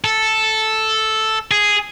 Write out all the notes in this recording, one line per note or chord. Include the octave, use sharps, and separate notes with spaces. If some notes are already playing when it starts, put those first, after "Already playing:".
A4
G#4